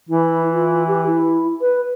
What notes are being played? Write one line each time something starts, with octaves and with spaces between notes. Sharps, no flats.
E3 E4
F4
G4
E4
B4